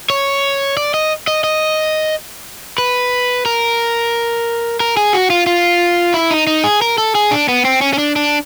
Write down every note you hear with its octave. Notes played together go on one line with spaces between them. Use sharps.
C#5
D5
D#5
D#5
D#5
B4
A#4
A#4
G#4
F#4
F4
F4
E4
D#4
D#4
G#4
A#4
A4
G#4
D4
B3
C4
C#4
C#4
D4
D4